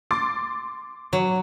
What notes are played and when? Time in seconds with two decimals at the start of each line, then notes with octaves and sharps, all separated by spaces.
0.11 C6 D6 A6
1.13 F#3